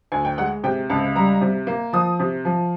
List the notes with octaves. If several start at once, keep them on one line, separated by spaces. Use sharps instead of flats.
D2 G#5
G5
G#3 F#5
C3 G5
C#2 A5
G3 A#5
C3
A#3
F3 D#6
C3
F3